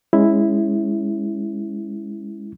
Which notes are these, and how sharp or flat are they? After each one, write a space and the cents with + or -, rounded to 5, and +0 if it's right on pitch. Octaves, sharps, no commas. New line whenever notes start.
G#3 -10 C#4 +0 E4 +0